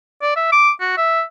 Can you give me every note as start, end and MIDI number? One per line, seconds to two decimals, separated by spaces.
0.22 0.36 74
0.36 0.47 76
0.52 0.70 86
0.80 0.96 66
0.97 1.22 76